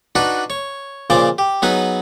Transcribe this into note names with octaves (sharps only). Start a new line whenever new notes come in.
D4 D#4 F#4 B4 F#5
C#5
A#2 C#3 F3 C5 D5 D6
G4
F#3 B3 D#4 G#4 B4